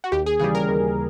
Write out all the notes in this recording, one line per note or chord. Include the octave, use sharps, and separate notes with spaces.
F#4
D#2 G4
G#4
C#3 E3 G3 G#4
A#4
D#2